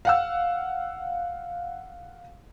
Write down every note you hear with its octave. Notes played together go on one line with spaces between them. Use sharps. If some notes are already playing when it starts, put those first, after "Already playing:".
F5 F#5 E6